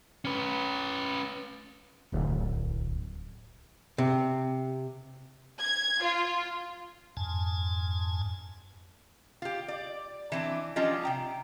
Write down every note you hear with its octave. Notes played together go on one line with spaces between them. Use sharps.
C#4 B4
D1 C2
C3
G#6
F4
F2 G#2 G#5 A5
F4 G4
D5
E3 C4 D4
F3 G3 C#4 D4 F4 D#5
C3 G5 A#5